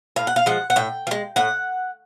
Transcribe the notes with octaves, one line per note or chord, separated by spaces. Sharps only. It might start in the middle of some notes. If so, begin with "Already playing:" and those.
A2 F5
F#5
F5
F3 G#3 F#5
F#5
A2 G5
F3
G#3
A2 F#5